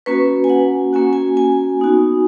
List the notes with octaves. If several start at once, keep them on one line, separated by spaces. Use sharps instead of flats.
A#3 C#4 F#4 B4
G#5
F#5
A#3 C#4 F#4 G#5
G#5
G#5
B3 D#4 F#4